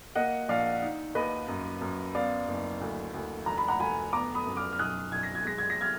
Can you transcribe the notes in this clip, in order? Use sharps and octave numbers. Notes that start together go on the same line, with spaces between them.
A#3 D#5 F#5
A#1 D5 F5
D#4
D#2 B4 D#5
F#2
F#2
B3 D5 F5
F#1
D2
D2
F1 A#5
B5
F#5 A#5
F1 G#5 B5
B3 A#5 D6
B5 D#6
F#2
D6 F6
F6
B1 D#6 F#6
B1 G#6
A#6
G#6
G#3 A#6
G#6
A#6
F6 G#6